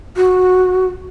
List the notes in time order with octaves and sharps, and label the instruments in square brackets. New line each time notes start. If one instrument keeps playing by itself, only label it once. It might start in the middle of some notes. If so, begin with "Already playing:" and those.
[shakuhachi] F#4